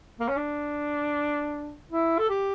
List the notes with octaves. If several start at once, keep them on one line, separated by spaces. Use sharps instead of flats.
A#3
C#4
D4
E4
A4
G4